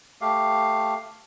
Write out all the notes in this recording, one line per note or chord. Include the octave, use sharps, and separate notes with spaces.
A3 G4 F5